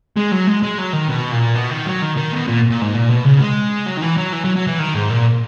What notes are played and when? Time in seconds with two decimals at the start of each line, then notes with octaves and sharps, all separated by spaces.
0.16 G#3
0.32 F#3
0.47 G#3
0.63 G#3
0.78 F#3
0.93 D#3
1.09 B2
1.32 A#2
1.55 B2
1.71 D#3
1.86 F#3
2.02 D#3
2.16 D#3
2.33 B2
2.48 A#2
2.71 A#2
2.82 G#2
2.94 A#2
3.09 B2
3.24 C#3
3.40 G#3
3.86 F#3
3.97 D#3
4.02 E3
4.17 F#3
4.33 E3
4.45 F#3
4.56 F#3
4.67 E3
4.79 D#3
4.95 G#2
5.10 A#2